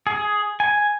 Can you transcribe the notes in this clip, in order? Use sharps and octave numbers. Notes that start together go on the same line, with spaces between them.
G#4
G#5